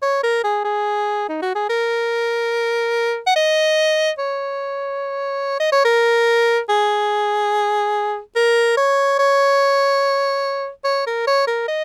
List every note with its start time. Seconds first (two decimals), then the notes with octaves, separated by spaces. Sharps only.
0.02 C#5
0.24 A#4
0.44 G#4
0.65 G#4
1.29 D#4
1.42 F#4
1.55 G#4
1.70 A#4
3.27 F#5
3.36 D#5
4.18 C#5
5.60 D#5
5.72 C#5
5.85 A#4
6.69 G#4
8.36 A#4
8.77 C#5
9.19 C#5
10.85 C#5
11.07 A#4
11.27 C#5
11.47 A#4
11.68 D#5